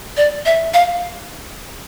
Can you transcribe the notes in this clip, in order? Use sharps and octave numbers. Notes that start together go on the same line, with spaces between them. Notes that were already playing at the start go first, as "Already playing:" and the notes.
D5
E5
F5